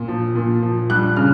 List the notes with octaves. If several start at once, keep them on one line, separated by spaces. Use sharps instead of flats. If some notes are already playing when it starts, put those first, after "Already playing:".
Already playing: A#2
F3
A#2
F3
G3 F#6
C#3 F6